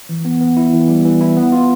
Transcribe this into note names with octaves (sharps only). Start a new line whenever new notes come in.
E3
B3
B3
E4
E3
G3
E3
E4
B3
F4